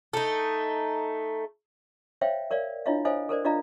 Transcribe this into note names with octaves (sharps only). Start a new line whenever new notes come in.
A3 D#4
C5 C#5 E5 F5 G5
A#4 C#5 D5 F5
D4 E4 F4 C#5 D#5 F5
A4 C5 C#5 D#5 F5 G#5
A4 A#4 C5 D5
D4 F4 D5 D#5 F5 A#5